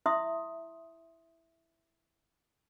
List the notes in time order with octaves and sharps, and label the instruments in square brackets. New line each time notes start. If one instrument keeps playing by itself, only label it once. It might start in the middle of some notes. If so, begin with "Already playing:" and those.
[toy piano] E4 E5 C6 D#6